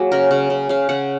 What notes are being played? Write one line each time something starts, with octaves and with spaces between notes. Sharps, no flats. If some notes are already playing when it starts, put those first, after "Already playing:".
Already playing: F#3 A#3 G#4
C#3 A#4
C#3
C#3
C#3 F5
C#3 F#5